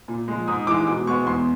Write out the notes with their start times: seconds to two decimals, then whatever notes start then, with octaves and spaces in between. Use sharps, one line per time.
0.08 A#2
0.28 F3 G#3
0.48 G#2 D#6
0.67 E3 G#3 D6
0.87 B2 D6
1.07 G#3 B3 C#6
1.27 E2 C6